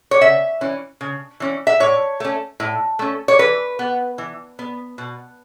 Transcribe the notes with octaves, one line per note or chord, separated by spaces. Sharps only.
C#5
C#3 E5
E3 C#4
C#3
E3 C#4
E5
A2 C#5
A3 C#4
A2
A3 C#4
C#5
E3 B4
B3
E3
B3
B2